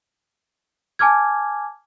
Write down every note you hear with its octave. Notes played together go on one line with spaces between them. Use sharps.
G#5 A5 D6 F6 G#6